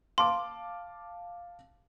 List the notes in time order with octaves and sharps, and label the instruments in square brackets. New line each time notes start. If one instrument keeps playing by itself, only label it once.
[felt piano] F5 A5 D6 [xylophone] C6